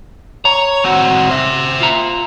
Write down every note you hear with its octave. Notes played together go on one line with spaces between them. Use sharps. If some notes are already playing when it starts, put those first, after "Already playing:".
C#5 A#5
C4 F#4
C5 E5
F4 A#5